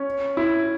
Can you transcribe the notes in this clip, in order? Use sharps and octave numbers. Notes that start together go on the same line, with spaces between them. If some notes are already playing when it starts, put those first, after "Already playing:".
Already playing: C#4
E4